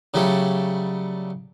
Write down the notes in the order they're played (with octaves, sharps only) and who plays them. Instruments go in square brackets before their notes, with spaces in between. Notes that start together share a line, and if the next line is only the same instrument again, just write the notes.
[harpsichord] C#3 F#3 G3 A3